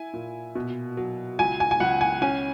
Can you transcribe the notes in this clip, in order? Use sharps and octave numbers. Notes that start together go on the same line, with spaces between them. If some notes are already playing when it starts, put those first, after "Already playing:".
Already playing: E4 G#5
A#2
B2
F#3
C#2 G#5
G#5
G#5
C#2 F#5
G#5
C#4 G#5